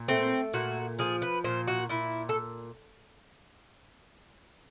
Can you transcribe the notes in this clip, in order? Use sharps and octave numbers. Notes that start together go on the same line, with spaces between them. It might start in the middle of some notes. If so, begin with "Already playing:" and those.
Already playing: A#2
A3 C4
A#2 F#4
F3 G#4
B4
A#2 C5
F#4
A#2 E4
A4